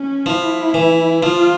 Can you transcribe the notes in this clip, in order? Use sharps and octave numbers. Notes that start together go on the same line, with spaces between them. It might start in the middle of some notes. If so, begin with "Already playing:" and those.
Already playing: C#4
F3 E4
E3
F3 F4